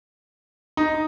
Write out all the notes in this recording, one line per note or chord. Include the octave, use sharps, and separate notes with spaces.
D#4